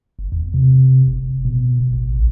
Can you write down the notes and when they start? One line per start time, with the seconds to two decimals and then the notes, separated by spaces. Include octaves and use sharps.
0.19 F#1
0.32 E2
0.54 C3
1.08 F#1
1.45 B2
1.80 D#1
1.94 A1
2.16 B1